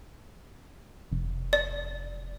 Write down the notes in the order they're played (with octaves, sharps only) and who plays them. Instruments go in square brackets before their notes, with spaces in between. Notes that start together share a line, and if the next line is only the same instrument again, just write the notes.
[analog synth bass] F1
[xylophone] D5